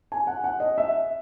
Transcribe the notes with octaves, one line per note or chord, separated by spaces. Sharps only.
G#5
F#5
F#5
D#5
E5